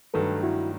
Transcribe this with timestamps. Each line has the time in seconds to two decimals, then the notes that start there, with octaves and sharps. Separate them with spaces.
0.14 G2 D#3 F#3 A3 A4 B4
0.43 E4 F#4